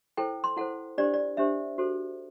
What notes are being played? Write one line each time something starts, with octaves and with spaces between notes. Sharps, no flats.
E4 A4 C5 G5
C6
E4 A4 C5 F#5
D4 G4 C5 D5
D5
D4 G4 C5 E5
F#4 A4 C5